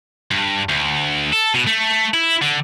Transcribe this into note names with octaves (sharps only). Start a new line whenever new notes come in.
G2
D2
A4
B2
A3
E4
D3